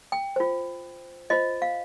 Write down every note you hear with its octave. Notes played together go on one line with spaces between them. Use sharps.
G5
F4 C5
F4 C5 D#5
F5